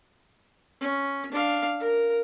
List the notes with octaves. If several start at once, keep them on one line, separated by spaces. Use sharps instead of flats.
C#4
D4 F5
A#4